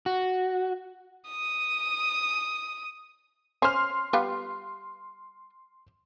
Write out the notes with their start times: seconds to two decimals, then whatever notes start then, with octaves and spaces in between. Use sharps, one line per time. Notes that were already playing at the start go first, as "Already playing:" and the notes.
0.06 F#4
1.29 D#6 D#7
3.62 C#4 C5 C6 F6
4.13 G3 B3 F4